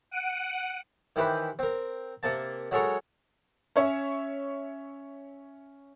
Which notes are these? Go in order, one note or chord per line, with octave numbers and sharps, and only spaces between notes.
F#5 D7 D#7
D#3 E3 G4 B4 C5
C4 A#4
C3 A#3 A5
F#3 G#3 A4 A#4 C#5
C#4 C#5 E5